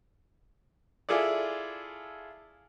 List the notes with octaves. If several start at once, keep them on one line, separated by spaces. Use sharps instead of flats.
E4 F4 G#4 A4 D5